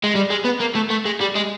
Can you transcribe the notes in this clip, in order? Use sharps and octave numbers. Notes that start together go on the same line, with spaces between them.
G#3
G3
G#3
B3
A#3
A3
A3
G#3
G3
G#3